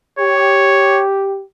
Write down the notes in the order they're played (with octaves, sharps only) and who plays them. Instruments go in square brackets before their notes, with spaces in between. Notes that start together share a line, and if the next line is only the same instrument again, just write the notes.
[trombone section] G4 [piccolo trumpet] C#5